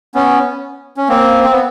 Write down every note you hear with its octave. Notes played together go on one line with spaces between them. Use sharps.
B3 C#4
C#4
A#3 C4
C4
B3